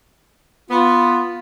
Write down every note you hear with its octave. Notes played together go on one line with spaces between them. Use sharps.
B3 F4